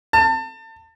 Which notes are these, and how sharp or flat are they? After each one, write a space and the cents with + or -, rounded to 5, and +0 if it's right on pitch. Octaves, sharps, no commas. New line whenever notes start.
A5 +30